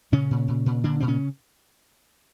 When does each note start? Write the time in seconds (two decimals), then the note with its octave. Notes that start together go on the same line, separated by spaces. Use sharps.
0.12 A#2 C#3 C#4
0.31 A#2
0.48 A#2
0.66 A#2
0.84 A#2 D3 D4
1.00 A#2 C4
1.08 C#3 C#4